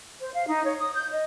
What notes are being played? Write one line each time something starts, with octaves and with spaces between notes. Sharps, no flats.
C5
F5
D#4
C#5
D#6
G6
D#5